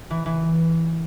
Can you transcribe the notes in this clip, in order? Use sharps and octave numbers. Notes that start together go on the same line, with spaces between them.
E3
E3